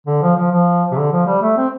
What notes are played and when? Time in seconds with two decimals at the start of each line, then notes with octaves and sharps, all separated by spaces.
0.07 D3
0.22 F3
0.37 F3
0.52 F3
0.92 C3
0.97 D3
1.12 F3
1.27 G3
1.42 A3
1.57 C4